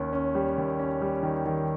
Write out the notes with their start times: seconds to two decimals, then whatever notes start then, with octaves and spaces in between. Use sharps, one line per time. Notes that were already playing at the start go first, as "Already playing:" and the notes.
Already playing: D#2 C#4
0.13 C#4
0.35 G3
0.58 D#2
0.79 C#4
1.02 G3
1.23 D#3
1.45 D#3